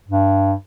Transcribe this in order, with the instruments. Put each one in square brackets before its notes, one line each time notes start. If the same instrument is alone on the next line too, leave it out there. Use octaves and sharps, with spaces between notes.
[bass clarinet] G2